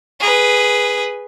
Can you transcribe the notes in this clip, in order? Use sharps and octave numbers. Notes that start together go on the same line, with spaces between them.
G#4 B4